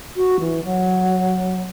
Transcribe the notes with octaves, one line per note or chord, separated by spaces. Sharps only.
F#4
E3
F#3